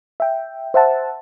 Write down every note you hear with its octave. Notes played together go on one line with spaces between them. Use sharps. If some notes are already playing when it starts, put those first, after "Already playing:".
E5 G5
C5 E5 F#5 A5